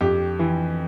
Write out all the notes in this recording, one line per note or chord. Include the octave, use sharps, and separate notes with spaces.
F2 G4
E3